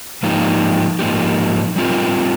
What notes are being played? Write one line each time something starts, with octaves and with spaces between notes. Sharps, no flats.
G#2 F3 A#3 D#4 G4
G#2 F3 A#3 D#4 G4
G3 C4 F4 A#4